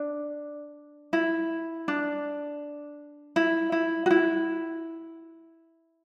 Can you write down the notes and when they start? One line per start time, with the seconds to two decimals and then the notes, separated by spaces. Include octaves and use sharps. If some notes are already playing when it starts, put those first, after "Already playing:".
Already playing: D4
1.13 E4
1.88 D4
3.36 E4
3.72 E4
4.06 F#4
4.10 E4